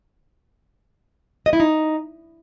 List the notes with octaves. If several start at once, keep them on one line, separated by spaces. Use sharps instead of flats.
D#5
E4
D#4